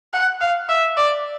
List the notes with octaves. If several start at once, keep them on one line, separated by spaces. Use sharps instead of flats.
F#5
F5
E5
D5